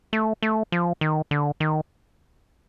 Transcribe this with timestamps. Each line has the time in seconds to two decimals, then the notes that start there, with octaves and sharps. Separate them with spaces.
0.13 A3
0.43 A3
0.72 F3
1.01 D#3
1.31 D3
1.60 D#3